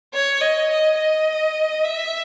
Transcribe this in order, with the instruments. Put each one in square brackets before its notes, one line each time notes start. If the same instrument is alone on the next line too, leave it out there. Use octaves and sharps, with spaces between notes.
[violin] C#5
D#5
D#5
D#5
E5